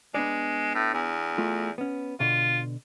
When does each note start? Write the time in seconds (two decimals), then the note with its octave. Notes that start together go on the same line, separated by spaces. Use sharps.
0.14 G#3 B3 D4 D5
0.74 A2
0.94 E2
1.38 A3 F4
1.78 B3 C#4
2.20 B2 D3 F4